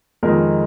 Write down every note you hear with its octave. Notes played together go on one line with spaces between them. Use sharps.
F2 D#3 G#3 D#4 A#4